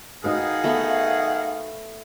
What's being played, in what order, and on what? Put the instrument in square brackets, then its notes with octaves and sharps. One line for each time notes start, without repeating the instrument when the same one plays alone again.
[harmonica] D#3 G#4 F#5 [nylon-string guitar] D#4 F#4 B4 [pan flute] F5
[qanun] A3 B3